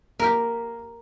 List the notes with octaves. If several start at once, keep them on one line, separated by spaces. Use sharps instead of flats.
A#3 G4 A#4